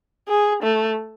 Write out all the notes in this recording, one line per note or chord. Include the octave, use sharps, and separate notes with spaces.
G#4
A3